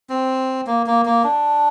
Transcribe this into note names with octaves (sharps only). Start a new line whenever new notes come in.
C4
A#3
A#3
A#3
D4